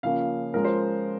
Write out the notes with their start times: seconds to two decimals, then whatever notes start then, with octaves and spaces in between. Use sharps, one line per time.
0.03 C#3 F3 A#3 C#4 F5
0.54 F3 G#3 C#4 A#4
0.64 C5